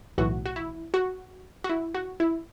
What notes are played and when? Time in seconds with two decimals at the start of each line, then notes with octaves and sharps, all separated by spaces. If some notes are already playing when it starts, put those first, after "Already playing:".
0.18 B1 A2 E3 F#4
0.46 F#4
0.56 E4
0.94 F#4
1.64 F#4
1.70 E4
1.95 F#4
2.20 E4